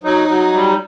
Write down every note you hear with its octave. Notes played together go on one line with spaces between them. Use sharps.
F#3 D#4
F#3
G3